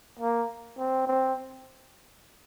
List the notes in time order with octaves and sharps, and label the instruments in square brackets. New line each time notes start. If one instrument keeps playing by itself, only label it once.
[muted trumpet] A#3
C4
C4